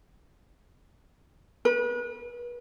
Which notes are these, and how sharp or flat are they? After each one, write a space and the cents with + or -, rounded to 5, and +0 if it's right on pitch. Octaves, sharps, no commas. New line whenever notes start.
B4 -35